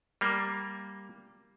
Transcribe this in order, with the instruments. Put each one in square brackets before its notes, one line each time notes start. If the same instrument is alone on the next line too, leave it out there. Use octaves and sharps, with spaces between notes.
[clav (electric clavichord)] G3 A#3